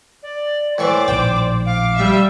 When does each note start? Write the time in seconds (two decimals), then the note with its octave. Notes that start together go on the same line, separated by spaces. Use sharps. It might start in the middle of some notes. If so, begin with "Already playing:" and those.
0.23 D5
0.78 A2 E3 C5 D5 C#6 D6
1.08 A#1 A2 D#3 G5
1.66 F5 D6
1.96 G3 E5